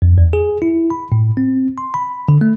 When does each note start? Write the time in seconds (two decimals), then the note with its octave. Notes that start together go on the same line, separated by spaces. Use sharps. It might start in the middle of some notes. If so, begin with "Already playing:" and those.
0.02 F2
0.18 E2
0.33 G#4
0.62 E4
0.90 B5
1.12 A2
1.37 C4
1.78 C6
1.94 B5
2.28 D3
2.41 A3